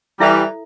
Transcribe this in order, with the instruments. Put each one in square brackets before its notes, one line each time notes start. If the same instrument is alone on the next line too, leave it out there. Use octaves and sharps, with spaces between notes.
[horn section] E3 G3 [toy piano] E4 A4 E5